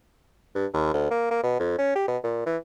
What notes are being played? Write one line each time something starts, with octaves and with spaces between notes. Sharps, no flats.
G2
D#2
D2
A#3
A#3
B2
F2
C#4
G4
B2
A#2
E3